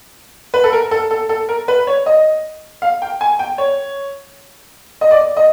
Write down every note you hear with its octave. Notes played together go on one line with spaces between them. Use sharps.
B4
A4
A#4
A4
A4
A4
A#4
B4
C#5
D#5
F5
G5
G#5
G5
C#5
D#5
D5
D#5